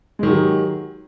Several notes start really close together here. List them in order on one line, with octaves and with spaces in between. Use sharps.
G#3 D#3 F#3 G4